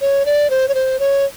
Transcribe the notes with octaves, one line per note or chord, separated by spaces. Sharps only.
C#5
D5
C5
C#5
C5
C#5